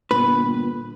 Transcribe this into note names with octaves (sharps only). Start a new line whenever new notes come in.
G1 A#2 B4